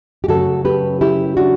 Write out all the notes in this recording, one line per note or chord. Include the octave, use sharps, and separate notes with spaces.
G4
F#2 C#3 F#3 A3 F#4 A4
G4 B4
E4 G4
D4 F#4